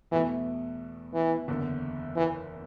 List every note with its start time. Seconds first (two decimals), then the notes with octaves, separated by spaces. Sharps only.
0.11 E2 B2 E3 A3
1.14 E3
1.48 F#1 E2 D3
2.16 E3